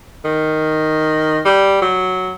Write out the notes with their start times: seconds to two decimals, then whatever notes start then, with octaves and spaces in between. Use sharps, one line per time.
0.25 D#3
1.45 G3
1.82 F#3